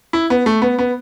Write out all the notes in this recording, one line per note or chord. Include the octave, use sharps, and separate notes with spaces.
E4
B3
A3
B3
B3